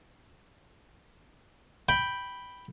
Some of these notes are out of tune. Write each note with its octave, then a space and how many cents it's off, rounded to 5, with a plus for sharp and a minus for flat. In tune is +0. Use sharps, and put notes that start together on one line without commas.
G5 +0 B5 +0